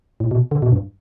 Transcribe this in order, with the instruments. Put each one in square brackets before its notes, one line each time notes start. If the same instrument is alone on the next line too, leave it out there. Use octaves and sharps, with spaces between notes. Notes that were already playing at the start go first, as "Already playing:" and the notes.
[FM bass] A2
B2
D3
B2
G2